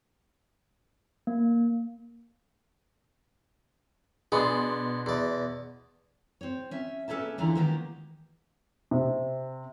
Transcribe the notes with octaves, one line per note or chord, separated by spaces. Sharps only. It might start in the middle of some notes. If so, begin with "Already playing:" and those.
A#3
B2 B3 D4 G#4 C6 D6
E2 D5
C4 C#5
C#4 E5
A#3 C#4 A4 B4 E5 A5
D#2 D3 E3 F4 D5 A#5
D#3 G#3 A#3 B3 G4 A#4
C3